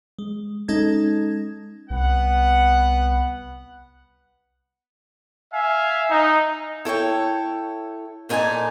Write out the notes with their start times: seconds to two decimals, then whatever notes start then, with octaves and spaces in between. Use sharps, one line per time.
0.19 G#3
0.68 G#3 C#4 D#4 A4 G#6
1.90 C2 B3 F#5
5.53 E5 F5 G#5
6.10 D#4
6.85 E4 A4 C#5 G5
8.29 F2 A#2 D#4 F#4 G#5 A5